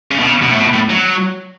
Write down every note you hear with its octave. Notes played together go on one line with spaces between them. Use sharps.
C#3
B2
C#3
B2
A2
B2
A2
F#3